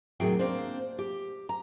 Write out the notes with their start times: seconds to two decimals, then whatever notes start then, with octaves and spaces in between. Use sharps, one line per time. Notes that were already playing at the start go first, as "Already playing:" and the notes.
0.20 D#2 A2 C3 F#3 G#4 G5
0.39 A#3 C4 D4 C5
0.99 G4
1.49 A#5